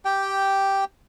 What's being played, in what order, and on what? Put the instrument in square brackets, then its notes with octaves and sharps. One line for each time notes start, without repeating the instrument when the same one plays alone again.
[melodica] G4 G5